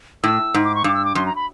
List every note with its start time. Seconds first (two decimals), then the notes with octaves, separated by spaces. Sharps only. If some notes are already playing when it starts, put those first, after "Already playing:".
0.24 A2 E6
0.54 G#2
0.64 D6
0.75 C#6
0.84 G2 D6
0.95 E6
1.05 D6
1.15 F#2 C6
1.26 A#5
1.36 B5